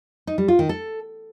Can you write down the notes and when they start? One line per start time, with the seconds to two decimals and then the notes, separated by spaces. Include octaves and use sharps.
0.27 D#4
0.38 G3
0.48 F4
0.59 D#3
0.69 A4